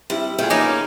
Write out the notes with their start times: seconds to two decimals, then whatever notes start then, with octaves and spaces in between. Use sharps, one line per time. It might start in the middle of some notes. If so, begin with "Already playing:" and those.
0.10 C3 G3 E4
0.38 A3 B3 F4 G#4 G5
0.50 D#2 A#3 C#4 D#4 G#5 D6